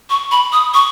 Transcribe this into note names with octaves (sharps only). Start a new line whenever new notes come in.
C#6
B5
D#6
C#6